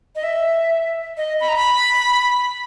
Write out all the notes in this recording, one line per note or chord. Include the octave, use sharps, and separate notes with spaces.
D#5
E5
D#5
B5
A#5
B5